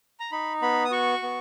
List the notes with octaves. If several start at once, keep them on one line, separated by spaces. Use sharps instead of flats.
A#5
D#4 B5
B3 B5
D#6
F#4 C#6
B3